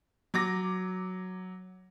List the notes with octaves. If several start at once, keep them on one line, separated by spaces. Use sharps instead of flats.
F#3 D6 A#6